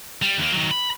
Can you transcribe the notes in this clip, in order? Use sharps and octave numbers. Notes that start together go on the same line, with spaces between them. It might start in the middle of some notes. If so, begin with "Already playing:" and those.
G3
D#2 A#3
D#3 F#3
B5